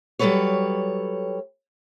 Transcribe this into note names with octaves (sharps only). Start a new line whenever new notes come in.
F#3 G3 A3 A4 B4 C#5